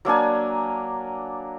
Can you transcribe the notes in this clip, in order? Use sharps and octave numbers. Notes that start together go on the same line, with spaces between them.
F#3 A#3 D4 G#5